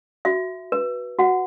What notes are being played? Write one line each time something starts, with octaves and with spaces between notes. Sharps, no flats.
F#4 E5
B4
F#4 F#5